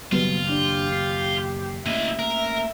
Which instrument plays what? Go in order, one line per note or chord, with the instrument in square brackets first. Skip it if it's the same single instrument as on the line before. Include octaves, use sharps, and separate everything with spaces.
[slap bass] F#1 D#3 [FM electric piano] F#3 G3 B3 [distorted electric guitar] F4
[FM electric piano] D4 [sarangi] G4
[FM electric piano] B6 C7
[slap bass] A3 A#3 C#4 [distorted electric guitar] E4 D#5 [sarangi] E5
[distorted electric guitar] A#4